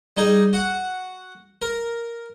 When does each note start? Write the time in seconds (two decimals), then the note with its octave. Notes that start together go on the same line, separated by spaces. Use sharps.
0.17 G3 D#4 G#4
0.53 F#4 F#5
1.62 A#4